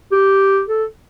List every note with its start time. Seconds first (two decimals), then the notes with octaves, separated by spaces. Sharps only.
0.12 G4
0.67 A4